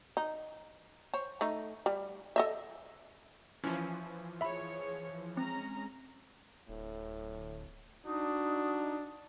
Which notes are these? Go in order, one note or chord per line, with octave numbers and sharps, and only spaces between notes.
D#4
C5 C#5
A3 D#4
G3
A4 D#5 E5
E3 F3 C#4
G#4 C#5 E5 B5
G#3 C4 C#4 A#5
D1 A2
D4 D#4 F#4 D#6